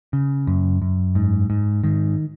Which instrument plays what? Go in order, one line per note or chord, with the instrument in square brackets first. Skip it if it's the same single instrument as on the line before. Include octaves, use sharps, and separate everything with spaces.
[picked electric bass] C#3
F#2
F#2
G#2
G#2
G#2 D#3